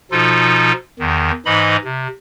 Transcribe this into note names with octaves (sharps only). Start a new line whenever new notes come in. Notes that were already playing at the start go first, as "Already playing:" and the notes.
B2 F3 D#4 F4 A4
E2 D#3
G#2 E3 D#4 D#5 B5
C3